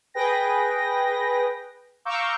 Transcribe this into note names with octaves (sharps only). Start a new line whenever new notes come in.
G#4 B4 G5 A#6
F5 A#5 C#6 D6 E6 G6